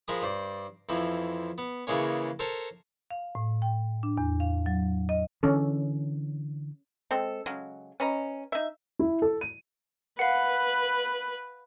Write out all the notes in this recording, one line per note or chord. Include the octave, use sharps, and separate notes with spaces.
F3 G#3 A#4 G#5 B5 D#6
G2 C5 D5
F2 E3 F3
B3
C#3 E3 G#3 A#3 C#4
A4 A#4 C5 C#5 A5 A#5
F5
A2
G5
D4
E2
F5
F#3
D#5
D3 E3 C#4 A4
G#3 C4 A4
C#3 F#3 G#3
C#4 B4 D#5 A#5
D#4 E5
E4
A4
D#7
B4 F5 F#5